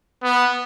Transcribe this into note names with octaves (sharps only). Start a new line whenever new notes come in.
B3